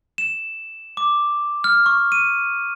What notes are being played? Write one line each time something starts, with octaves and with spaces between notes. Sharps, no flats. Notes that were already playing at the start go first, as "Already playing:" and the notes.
E7
D6
F6
C#6
D#7